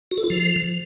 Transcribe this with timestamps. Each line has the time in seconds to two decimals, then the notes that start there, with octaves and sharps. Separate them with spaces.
0.11 F#4
0.18 A4
0.24 F4
0.30 F3